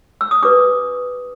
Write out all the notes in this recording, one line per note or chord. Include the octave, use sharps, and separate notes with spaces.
E6
D#6
D4 G4 B4 D6